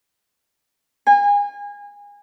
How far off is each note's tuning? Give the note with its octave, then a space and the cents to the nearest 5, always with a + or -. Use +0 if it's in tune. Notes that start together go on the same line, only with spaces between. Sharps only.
G#5 -30